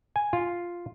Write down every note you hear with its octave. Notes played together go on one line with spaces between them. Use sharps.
G#5
F4